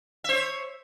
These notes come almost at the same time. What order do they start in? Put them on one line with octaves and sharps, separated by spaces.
E5 C5 C#5